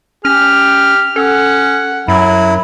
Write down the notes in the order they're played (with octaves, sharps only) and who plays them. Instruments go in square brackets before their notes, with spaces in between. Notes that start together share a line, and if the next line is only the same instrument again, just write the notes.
[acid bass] C#4 [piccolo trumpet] G4 [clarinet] F6
[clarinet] C#4 [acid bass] A4 [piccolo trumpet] F#5
[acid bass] F#2 [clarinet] F#3 [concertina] E4